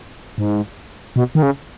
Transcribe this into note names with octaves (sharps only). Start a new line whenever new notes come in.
G#2
B2
D#3
C#3